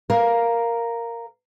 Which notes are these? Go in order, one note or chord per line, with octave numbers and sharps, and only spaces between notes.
A#4 F5